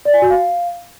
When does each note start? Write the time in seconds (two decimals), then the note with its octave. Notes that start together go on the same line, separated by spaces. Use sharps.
0.05 D5
0.14 G#5
0.22 F#4
0.30 F5